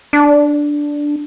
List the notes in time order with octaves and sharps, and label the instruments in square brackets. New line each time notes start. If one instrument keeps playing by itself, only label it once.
[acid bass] D4